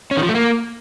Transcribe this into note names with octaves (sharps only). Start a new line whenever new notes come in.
C#4
D#3
F3
A3
A#3